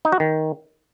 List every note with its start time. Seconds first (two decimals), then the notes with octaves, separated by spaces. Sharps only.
0.05 D#4
0.12 F#4
0.20 D#3